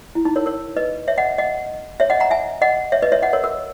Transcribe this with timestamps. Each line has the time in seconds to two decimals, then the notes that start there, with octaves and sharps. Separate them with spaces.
0.15 E4
0.25 D#4
0.36 A#4 C#5
0.46 A#4 C#5
0.76 B4 D#5
1.08 C#5 E5
1.18 D#5 F#5
1.38 D#5 F#5
2.00 C#5 E5
2.10 D#5 F#5
2.20 F#5 A#5
2.31 E5 G#5
2.62 D#5 F#5
2.92 C#5 E5
3.02 B4 D#5
3.12 C#5 E5
3.22 D#5 F#5
3.33 A#4 C#5
3.44 A#4